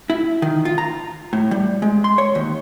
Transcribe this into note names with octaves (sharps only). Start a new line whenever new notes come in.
E4
D#3
F4
A#5
A2
G3
G#3
C6
C#5
D#2